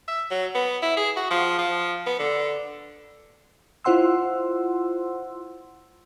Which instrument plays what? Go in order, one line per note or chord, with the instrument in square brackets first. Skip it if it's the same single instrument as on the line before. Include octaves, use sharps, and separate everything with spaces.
[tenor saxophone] E5
F#3
B3
E4
G#4
F#4
F3
F3
B3
D3
[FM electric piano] E4 F4 C5 F#5 C6 E6